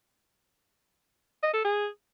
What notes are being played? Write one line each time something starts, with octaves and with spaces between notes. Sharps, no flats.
D#5
A4
G#4